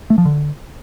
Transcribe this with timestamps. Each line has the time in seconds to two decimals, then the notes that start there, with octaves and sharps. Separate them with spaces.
0.10 A3
0.18 F3
0.25 D3